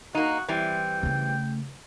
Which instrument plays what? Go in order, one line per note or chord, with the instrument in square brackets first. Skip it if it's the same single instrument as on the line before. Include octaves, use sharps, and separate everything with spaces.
[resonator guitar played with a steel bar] A#3 D#4 [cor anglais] F#4
[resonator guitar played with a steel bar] E3 G3 C4 [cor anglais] G5
[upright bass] C#3 A3